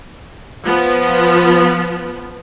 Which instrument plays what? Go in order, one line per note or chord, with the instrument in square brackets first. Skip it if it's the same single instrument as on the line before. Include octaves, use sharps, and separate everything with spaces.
[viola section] F3 B3